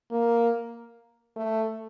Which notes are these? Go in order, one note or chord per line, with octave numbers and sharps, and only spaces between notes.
A#3
A3